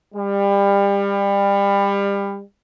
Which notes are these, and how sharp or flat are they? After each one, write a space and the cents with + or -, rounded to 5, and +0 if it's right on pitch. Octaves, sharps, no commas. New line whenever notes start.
G3 +30